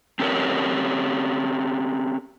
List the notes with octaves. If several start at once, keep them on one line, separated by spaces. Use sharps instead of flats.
C4 C#4 G4 A4 A#4 C#5